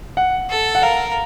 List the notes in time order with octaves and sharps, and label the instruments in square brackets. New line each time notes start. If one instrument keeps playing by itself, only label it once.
[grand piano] F#5
[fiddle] A4
[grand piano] F#5
[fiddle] A#4 [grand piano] F5